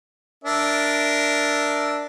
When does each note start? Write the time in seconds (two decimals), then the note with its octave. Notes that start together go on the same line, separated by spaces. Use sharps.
0.44 D4 A#4 E5